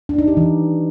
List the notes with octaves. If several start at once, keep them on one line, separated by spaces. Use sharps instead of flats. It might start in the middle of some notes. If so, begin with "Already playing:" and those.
D4
D#4
G4
E3